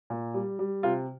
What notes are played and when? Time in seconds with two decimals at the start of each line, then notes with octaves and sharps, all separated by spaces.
0.10 A#2
0.34 G3
0.59 G3
0.83 C3 F4